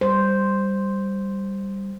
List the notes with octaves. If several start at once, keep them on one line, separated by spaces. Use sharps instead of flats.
G3 C5